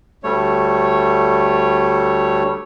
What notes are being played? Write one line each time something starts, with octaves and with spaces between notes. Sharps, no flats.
D2 G3 A3 C#5